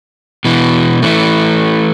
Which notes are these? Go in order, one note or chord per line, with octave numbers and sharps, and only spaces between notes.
B2 E3
E3 A3